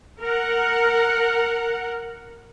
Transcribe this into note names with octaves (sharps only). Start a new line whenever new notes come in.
A#4 F#5